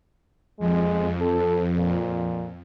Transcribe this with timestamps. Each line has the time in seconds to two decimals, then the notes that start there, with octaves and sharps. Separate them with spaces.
0.60 F2 G#3
1.21 A4
1.78 A#2